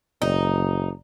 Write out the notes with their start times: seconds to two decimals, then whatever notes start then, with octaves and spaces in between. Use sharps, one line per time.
0.22 F#1 D#4